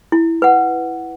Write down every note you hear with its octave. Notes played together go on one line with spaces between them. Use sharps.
E4
B4 F#5